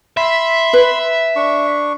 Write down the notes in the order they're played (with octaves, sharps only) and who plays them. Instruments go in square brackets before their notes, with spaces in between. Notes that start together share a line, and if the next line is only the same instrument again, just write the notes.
[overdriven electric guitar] E5 [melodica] B5 C6
[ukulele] B4
[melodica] D4 C#6